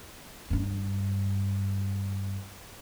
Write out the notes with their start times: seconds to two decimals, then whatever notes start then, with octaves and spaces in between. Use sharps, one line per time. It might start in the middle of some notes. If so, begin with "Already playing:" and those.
0.50 G2 D4